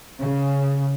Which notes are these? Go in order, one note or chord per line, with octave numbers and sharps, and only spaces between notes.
C#3